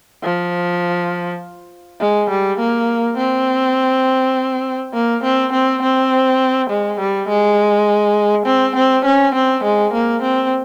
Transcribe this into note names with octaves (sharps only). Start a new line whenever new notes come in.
F3
G#3
G3
A#3
C4
A#3
C4
C4
C4
G#3
G3
G#3
C4
C4
C#4
C4
G#3
A#3
C4